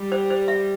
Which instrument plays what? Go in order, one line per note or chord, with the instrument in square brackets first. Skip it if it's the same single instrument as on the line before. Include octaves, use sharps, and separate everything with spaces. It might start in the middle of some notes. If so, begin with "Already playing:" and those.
Already playing: [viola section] G3
[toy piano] C5
C5
E5